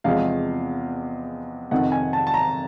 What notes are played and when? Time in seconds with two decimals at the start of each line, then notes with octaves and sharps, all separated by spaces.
0.04 E2 C3 F3 G#3 F5
1.71 F2 C3 D#3 F#5
1.92 G#5
2.13 A5
2.27 A5
2.34 A#5